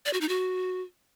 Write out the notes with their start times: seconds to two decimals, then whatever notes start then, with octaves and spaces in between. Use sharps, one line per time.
0.06 D5
0.13 F#4
0.21 D#4
0.29 F#4